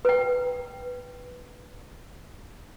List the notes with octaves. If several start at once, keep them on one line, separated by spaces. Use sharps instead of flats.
B4 G5